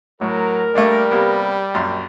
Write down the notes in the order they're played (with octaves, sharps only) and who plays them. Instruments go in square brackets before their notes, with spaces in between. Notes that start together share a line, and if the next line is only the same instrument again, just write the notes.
[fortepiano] A2 [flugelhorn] F#3 [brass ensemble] A#4
[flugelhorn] G3 [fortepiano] A3 A#3 D4
[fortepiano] C3 A#3 B3
A#1 F#2 C6